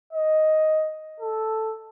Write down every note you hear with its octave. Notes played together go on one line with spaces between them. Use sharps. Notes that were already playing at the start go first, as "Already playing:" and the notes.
D#5
A4